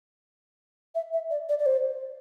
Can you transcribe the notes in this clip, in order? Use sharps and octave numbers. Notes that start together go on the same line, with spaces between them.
E5
E5
D5
D5
D5
C5